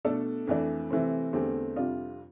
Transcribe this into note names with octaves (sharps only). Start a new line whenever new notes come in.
B2 A3 D4 A4
F2 E3 A3 D4
C3 E3 A3 C4
E2 D3 A3 C4 G4
F2 C3 G3 D4 F4